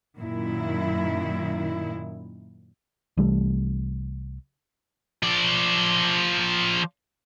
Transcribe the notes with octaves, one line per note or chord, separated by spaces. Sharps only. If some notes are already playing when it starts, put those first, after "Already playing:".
F#2 A#2 D#3 E4
C2 E3 G3 A3
F3 D5